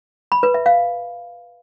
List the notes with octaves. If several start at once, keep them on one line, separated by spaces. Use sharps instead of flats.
B5
B4
E5
F5